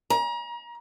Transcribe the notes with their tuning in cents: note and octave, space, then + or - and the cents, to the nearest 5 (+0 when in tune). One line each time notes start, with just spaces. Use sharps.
A#5 +35